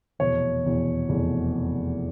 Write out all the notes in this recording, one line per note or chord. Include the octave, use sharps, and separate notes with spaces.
F1 E2 B2 C#5
F1 E2 B2
F1 E2 B2